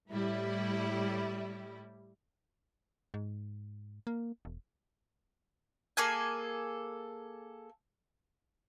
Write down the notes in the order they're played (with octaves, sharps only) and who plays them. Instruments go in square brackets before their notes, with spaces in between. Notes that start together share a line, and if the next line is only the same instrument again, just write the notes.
[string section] A2 G3 E4
[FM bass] G#2
A#3
E1
[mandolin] A#3 G#4 A4 G#5